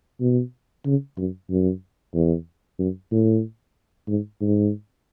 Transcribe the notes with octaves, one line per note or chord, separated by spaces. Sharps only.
B2
C#3
F#2
F#2
E2
F#2
A2
G#2
G#2